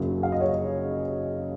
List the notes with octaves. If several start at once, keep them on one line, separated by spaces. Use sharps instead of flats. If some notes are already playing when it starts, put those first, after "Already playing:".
Already playing: F#1 F#2 C#3 F#3
F5
D#5
C#5
D#5